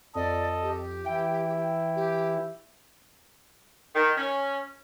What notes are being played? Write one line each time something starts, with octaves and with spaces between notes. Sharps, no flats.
F2 A4 D5 D#5
G4
E3 E4 G5
G4
D#3
C#4